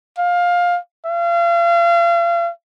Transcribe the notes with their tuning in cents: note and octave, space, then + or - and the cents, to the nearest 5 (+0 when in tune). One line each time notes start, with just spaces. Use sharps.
F5 +15
F5 -35